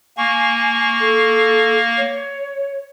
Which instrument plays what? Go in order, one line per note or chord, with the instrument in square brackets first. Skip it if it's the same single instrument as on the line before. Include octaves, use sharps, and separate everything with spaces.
[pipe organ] A#3 C#6 [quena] G#5
[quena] A4
C#5